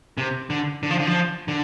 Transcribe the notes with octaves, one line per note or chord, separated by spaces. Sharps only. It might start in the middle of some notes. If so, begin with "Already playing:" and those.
C3
D3
D3
F3
D3
F3
D3